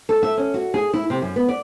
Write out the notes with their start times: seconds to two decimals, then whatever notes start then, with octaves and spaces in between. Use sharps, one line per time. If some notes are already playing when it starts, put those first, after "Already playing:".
0.09 A4
0.22 E5
0.37 C#4
0.54 F#4
0.74 G#4
0.93 E4
1.10 C3
1.22 F#2
1.36 B3
1.49 D5